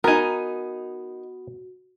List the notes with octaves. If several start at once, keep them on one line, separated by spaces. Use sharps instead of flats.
B3 D#4 F#4 A#4 G#5